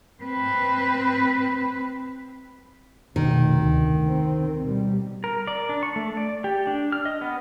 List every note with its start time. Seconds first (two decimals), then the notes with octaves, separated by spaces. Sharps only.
0.23 C4 B4
3.16 F1 B2 D#3
3.60 D2
4.02 C4
4.60 B2 G3
5.24 A#4
5.47 D5
5.69 D4
5.83 C#6
5.96 A3
6.17 D5
6.44 G4
6.67 D4
6.92 F6
7.05 D#5
7.21 B3